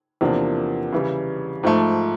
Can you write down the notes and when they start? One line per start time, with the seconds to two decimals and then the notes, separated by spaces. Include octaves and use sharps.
0.21 E2 C3 F3 A#3 D4
0.92 C#3 E3 G3
1.63 G#2 F3 A3